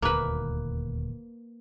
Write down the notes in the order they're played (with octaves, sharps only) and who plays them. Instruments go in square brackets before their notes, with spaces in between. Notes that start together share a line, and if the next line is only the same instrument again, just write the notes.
[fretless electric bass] D#1 D2 [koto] A#3 B4